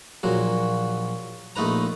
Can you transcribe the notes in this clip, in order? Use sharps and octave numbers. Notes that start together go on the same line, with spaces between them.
A#1 A#2 F#3 F#4
A#1 A3 D#4 B4 A#5